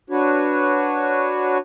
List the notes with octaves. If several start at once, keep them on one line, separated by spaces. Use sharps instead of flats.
D4 F#4 B4 C#5